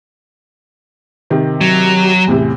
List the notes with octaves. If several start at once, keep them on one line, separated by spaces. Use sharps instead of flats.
C3 D#3
F#3
E2 A2 C3